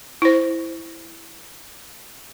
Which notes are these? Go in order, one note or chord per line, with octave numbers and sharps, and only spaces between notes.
E4 C5